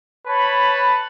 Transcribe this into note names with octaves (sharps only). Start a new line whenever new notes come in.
B4 C#5 A5 B5